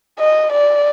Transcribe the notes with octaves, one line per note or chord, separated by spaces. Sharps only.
D#5
D5